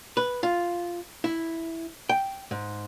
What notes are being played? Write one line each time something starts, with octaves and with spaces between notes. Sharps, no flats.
B4
F4
E4
G5
G#2